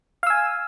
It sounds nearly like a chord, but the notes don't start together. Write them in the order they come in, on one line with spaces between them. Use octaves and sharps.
F5 E6 G#5